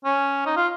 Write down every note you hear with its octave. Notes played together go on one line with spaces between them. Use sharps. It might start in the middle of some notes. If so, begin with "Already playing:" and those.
C#4
D#4
F4